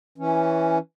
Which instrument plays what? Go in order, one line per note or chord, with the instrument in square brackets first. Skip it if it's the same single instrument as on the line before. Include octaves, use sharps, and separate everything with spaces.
[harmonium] E3 C#4